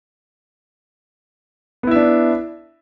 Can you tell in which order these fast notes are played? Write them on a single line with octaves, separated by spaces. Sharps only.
B3 E4 E5 D4